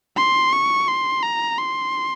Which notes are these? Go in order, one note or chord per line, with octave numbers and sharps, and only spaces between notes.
C6
C#6
C6
A#5
C6